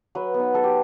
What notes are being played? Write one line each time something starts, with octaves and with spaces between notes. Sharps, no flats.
F#3 B4
B3
D#4
F#3 A4
G4